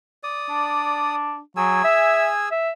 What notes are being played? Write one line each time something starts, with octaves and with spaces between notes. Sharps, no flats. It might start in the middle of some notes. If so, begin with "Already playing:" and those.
D5 D#6
D4
F#3 G#4 G#5 E6
E5
E5